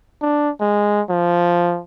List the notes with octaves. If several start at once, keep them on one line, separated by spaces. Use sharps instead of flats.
D4
G#3
F3